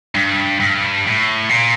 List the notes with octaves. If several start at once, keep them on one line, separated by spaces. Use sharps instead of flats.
G2
G2
A2
A#2